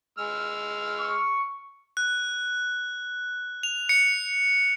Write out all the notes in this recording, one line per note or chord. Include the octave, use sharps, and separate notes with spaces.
G#3 E6 F6
C#6
F#6
F7
C#7